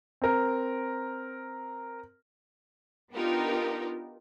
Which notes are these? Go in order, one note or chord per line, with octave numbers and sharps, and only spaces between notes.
C4 A#4
B3 D4 D#4 F4 G4 A#4